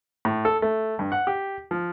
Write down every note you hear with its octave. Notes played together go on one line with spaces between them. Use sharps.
A2
A4
A3
G2
F#5
G4
F3